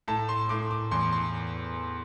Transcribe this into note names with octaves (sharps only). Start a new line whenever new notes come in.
A2 A5
C6
A2 D6
D6
E2 C6
C6